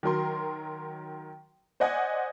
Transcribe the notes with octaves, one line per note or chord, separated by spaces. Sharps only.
D#3 F#3 A#4 C6
C5 D5 D#5 F#5 G#5